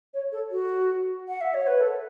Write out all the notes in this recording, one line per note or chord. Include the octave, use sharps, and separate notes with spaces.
C#5
A4
F#4
F#5
E5
C#5
B4
A4